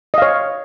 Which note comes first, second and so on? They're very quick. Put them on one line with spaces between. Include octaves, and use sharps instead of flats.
D#5 F5 C#5